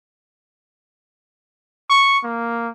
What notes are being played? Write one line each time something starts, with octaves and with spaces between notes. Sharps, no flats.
C#6
A#3